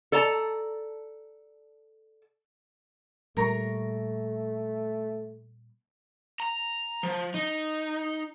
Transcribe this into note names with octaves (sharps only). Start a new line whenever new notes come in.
A4 D5 A5 A#5
A#2 G3 A3 A#3 A#4 A#5 C#6
A#5
F3
D#4